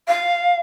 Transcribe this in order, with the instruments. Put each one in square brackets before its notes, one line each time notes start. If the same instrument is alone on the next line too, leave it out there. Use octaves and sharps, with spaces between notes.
[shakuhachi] F5